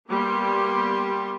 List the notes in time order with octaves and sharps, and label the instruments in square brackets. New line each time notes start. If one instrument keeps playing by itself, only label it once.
[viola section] G3 A#3 B3 G4 C6